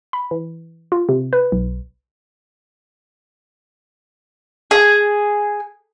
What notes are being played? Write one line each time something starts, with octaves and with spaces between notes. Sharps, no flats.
B5
E3
F4
C3
B4
B1
G#4